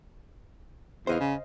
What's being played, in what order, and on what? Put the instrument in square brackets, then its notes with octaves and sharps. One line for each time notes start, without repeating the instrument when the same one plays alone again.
[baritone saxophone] E2 [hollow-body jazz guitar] C5 D#5 F5
[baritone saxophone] C#3